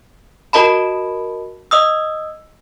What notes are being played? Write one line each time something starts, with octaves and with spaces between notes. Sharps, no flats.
F#4 A#4 D#5 A5 B5
D#5 D#6 E6